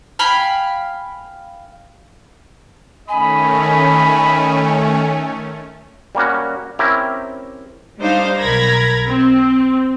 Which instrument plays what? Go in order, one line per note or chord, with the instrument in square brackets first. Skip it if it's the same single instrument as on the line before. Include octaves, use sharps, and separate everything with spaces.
[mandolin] F5 G5 G#5 B5
[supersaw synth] D#3 A3 C#4 [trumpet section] D#5 B5 [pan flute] G#5
[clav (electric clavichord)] G3 A#3 C#4 F#4
C4 C#4 E4 G4 A#4
[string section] G3 D4 D#4 C5 F5
B1 A#4 B5 G#6 A#6
C4